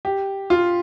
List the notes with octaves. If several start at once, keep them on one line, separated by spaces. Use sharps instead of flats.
G4
F4